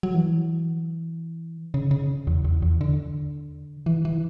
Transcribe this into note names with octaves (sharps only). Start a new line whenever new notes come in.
F#3
E3
C#3
C#3
E2
E2
E2
D3
E3
E3